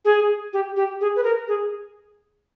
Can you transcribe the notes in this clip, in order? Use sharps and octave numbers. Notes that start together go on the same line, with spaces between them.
G#4
G4
G4
G#4
B4
A#4
G#4